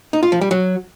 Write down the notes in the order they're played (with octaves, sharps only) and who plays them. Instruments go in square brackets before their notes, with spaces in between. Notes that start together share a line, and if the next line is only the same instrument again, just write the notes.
[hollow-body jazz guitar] D#4
F4
F3
G3
F#3